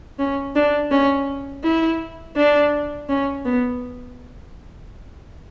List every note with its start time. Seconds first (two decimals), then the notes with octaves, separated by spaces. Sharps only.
0.19 C#4
0.55 D4
0.91 C#4
1.64 E4
2.36 D4
3.09 C#4
3.45 B3